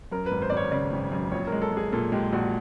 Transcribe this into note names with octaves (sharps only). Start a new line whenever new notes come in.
F#2 A#4
B4
G#1
C5
D5
G#1 C#5
C#3 D5
G#1
F#2
A#1 C#5
G#3 A#4
A4
G#3 G#4
A#2 A4
G#3 G4
A#1 F#4